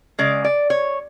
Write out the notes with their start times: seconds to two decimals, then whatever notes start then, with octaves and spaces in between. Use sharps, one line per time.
0.19 C#3 G#3 D5
0.45 D5
0.70 C#5